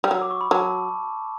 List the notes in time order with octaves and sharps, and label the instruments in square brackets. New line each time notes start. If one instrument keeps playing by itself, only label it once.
[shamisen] G3
[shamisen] F#3 [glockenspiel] E6
[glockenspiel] D6
C#6
B5
[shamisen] F#3 [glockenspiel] A5